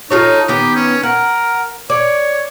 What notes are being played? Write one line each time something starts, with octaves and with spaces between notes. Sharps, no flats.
D#4 F4 A4 C#5
D#3 B3 G4
C#4
A#4 F#5
C#5 D5